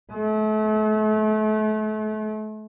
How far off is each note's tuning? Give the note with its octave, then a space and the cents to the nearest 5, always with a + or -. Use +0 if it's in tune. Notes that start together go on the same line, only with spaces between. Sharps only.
A3 -35